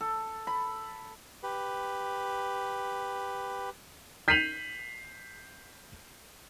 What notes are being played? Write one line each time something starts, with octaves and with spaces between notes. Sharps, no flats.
A4
B5
G4 B4
G6 B6 C7 D#7 F7 F#7